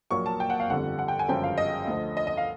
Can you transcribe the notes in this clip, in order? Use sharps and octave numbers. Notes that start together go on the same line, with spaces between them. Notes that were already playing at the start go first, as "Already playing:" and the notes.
A#1 A#2 F#3 A#3 C#6
A5
G5
F#5
F5
G1 F2 D3 G3 F#5
F#5
G5
G#5
G1 F#2 C#3 F3 G#3 G5
F5
D#5
D2 D3 F3
D#5
D#5
F5